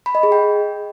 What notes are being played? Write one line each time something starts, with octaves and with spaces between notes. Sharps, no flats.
B5
D#5
G#4
G5